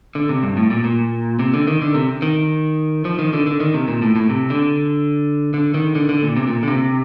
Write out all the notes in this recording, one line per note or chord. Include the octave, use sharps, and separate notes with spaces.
D3
C3
G2
A2
A#2
A#2
C3
D3
D#3
D3
C3
D#3
F3
D#3
D3
D3
D#3
C3
A#2
A2
A2
C3
D3
D3
D#3
D3
D3
A#2
C3
A#2
D3
C3